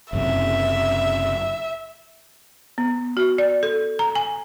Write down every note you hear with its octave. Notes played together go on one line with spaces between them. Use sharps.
F#1 F#2 C3 E5
B3
F#4
D5
A4
A#5
G#5